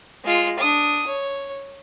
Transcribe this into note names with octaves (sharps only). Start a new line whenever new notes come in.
G#3 F4
D4 D#6
C#5